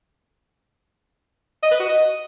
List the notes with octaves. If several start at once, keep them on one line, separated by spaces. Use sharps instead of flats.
D#5
B4
F#4
D#5